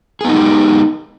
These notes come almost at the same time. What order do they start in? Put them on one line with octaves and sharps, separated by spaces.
G#4 B3 D#4 G#3 G4